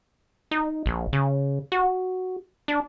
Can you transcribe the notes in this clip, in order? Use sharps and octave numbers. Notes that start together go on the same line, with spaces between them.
D#4
A#1
C#3
F#4
D4